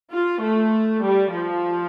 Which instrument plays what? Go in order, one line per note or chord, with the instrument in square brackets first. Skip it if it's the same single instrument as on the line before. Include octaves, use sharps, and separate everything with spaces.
[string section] F4
A3
G3
F3